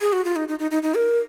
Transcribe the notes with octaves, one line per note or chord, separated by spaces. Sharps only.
G#4
F#4
F4
D#4
D#4
D#4
D#4
D#4
A#4